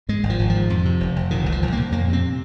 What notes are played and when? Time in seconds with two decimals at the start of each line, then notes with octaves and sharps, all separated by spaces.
0.09 G#2 G#3
0.23 G#1
0.30 F3
0.39 G#1
0.50 G#2 F3
0.70 F2
0.85 C3
1.00 F1
1.16 F1
1.31 A#2 D#3
1.46 C2
1.52 F3
1.62 C2
1.72 A#2 A#3
1.92 F2 A#3
2.08 C3 C4